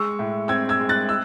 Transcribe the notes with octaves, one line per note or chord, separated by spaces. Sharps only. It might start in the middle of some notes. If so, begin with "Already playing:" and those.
Already playing: G#3 C#6 E6
A2
C4 E6 G#6
E6 G#6
G#3
F#6 A6
E6